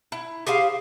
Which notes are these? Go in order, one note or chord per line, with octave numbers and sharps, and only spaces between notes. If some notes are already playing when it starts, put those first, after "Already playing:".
E4
G4 G#4 C5 F5